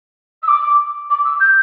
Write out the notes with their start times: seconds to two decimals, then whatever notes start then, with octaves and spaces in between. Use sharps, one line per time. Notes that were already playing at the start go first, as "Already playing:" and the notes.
0.42 E6
0.48 D6
1.10 D6
1.24 E6
1.40 G6